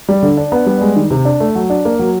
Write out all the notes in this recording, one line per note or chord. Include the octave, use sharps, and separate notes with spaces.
G3
D3
D4
B3
G3
G#3
D#3
C3
D4
A3
F#3
D4
A#3
F#3